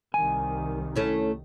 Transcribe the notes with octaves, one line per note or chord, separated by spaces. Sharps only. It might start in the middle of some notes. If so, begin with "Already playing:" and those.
C2 D#3 G#5
A3 C#4 E4